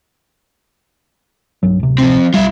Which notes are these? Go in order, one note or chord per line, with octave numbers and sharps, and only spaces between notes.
B1 G2 F#3
D1 C3
F3 C4
B1 G3 F4 E5